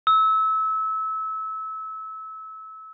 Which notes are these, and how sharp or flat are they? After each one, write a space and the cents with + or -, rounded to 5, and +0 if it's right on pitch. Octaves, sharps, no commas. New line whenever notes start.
E6 -25